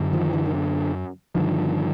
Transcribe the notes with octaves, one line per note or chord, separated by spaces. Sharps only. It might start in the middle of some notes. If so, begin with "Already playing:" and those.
Already playing: F#2 D3
D#3 F3
D3 E3
D#3
D3
G2 D3 D#3 F3